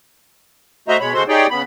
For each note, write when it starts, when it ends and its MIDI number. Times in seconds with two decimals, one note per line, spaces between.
0.88 0.97 57
0.88 0.97 66
0.88 0.97 72
0.88 0.97 75
0.88 0.97 76
0.88 0.97 82
1.00 1.13 47
1.00 1.13 56
1.00 1.13 73
1.00 1.13 83
1.14 1.23 49
1.14 1.23 56
1.14 1.23 66
1.14 1.23 69
1.14 1.23 72
1.14 1.23 84
1.28 1.47 63
1.28 1.47 67
1.28 1.47 68
1.28 1.47 73
1.28 1.47 74
1.28 1.47 79
1.51 1.62 49
1.51 1.62 59
1.51 1.62 83